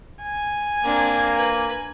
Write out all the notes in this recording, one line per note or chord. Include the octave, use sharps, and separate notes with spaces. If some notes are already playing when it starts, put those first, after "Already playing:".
G#5
A#3 C4 D4
B4